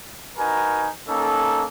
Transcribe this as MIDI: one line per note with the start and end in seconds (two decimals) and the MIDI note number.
0.38 0.90 63
0.38 0.90 66
0.38 0.90 70
0.38 0.90 71
0.38 0.90 80
1.07 1.64 58
1.07 1.64 61
1.07 1.64 63
1.07 1.64 69